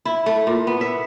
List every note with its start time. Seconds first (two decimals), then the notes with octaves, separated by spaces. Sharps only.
0.05 E4
0.26 A3
0.47 A#2
0.67 B3
0.81 E5